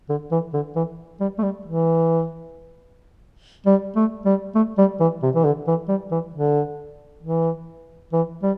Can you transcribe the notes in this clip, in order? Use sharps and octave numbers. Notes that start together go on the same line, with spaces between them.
D3
E3
D3
E3
G3
A3
G3
E3
G3
A3
G3
A3
G3
E3
C3
E3
D3
E3
G3
E3
D3
E3
E3
G3